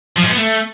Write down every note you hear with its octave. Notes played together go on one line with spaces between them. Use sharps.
F3
G#2
B3
A3